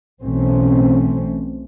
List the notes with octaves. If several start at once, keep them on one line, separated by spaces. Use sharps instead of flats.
B1 B2 E3 A3 C4 C#4